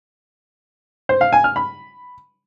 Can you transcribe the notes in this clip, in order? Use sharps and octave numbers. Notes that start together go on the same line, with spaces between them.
C5
F5
G#5
F6
B5